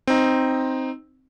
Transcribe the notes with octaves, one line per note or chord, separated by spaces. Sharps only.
C4 D#4